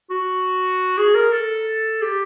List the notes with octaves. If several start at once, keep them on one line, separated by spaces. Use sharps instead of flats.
F#4
G#4
A#4
A4
G4